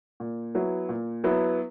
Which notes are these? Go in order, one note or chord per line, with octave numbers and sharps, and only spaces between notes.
A#2
F#3 B3 E4
A#2
F#3 B3 E4